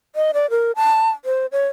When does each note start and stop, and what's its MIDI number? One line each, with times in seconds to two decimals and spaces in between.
0.16 0.32 75
0.34 0.49 74
0.50 0.72 70
0.76 1.09 81
1.25 1.46 72
1.52 1.67 73